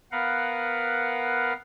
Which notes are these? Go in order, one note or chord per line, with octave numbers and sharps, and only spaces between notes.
B3 A#4 B4 F5 F#5